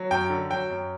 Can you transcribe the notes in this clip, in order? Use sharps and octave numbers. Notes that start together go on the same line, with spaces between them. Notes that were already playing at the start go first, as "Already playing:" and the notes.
Already playing: F#3
F#2 G5
D3
F#3 G5
F#2